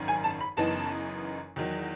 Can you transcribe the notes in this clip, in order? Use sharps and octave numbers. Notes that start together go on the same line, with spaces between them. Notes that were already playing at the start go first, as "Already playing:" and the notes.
Already playing: G#1 F#2 D#3
G#5
A5
B5
F#1 F#2 E3 B3 D#4 A5
E2 D#3 F#3